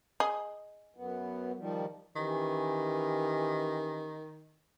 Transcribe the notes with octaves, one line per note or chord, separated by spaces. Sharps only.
G#4 D#5
F#2 B3
D#3 F3 G3
D#3 E3 C#4 G4